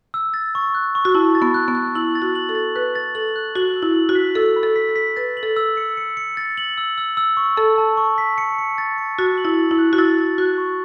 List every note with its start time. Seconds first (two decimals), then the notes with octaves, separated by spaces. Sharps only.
0.14 E6
0.34 A6
0.55 C#6
0.75 F#6
0.95 C#6
1.05 F#4
1.15 E4 A5
1.35 A6
1.42 B3
1.54 F#6
1.68 B3
1.75 F#6
1.95 E4 F#7
2.15 A6
2.22 F#4
2.35 F#7
2.49 A4
2.55 A6
2.75 B4 F#6
2.95 A6
3.15 A4 F#7
3.36 F#6
3.56 F#4 F#7
3.76 E6
3.83 E4
3.96 F#7
4.09 F#4
4.15 B6
4.35 A4 E6
4.56 B5
4.63 A4
4.76 B6
4.89 A4
4.96 B6
5.16 B4 A6
5.37 F#7
5.43 A4
5.56 E6
5.77 C#7
5.97 C#7
6.17 C#7
6.37 A6
6.57 F#7
6.78 E6
6.98 E6
7.17 E6
7.37 C#6
7.57 A4 A5
7.78 A5
7.97 C#6
8.18 B6
8.38 C#7
8.58 C#7
8.78 A6
8.98 C#7
9.19 F#4 A6
9.38 F#7
9.45 E4
9.59 A6
9.71 E4
9.79 F#6
9.93 F#4
9.98 E4 A6
10.18 A6
10.38 F#4 F#6
10.58 C#6